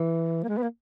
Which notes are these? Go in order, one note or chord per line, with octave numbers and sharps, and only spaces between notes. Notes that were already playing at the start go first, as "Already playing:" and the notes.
Already playing: E3
A#3
G#3
B3
A#3